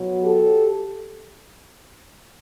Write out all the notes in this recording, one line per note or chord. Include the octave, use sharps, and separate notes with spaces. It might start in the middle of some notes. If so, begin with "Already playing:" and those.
Already playing: B2 F#3
G4 A4